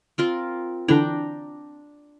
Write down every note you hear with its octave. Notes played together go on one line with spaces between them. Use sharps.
C4 F4 A#4
D3 E3 D4 G5 A#5